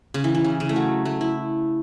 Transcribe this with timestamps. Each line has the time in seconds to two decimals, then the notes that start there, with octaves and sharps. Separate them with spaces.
0.14 C#3
0.24 E3
0.35 E3
0.44 C#3
0.60 C#3
0.69 A3
0.76 F#3
1.05 A3
1.21 E4